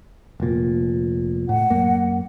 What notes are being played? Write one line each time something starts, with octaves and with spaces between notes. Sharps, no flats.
F1 A#2
A2 F#5
F#2 A#3